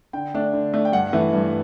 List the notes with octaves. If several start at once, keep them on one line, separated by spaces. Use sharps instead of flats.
D3 G5
A3 D4
D3
A3 D4
G5
G2 F#5
E3 A3
G2